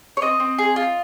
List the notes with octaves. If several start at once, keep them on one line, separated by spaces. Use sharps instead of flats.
C#5
C4 D#5
C4
G#4
F4